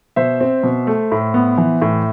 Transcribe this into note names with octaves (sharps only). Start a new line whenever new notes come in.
B2 C5 E5
C4
B2
A3
A2
B3
E3
A2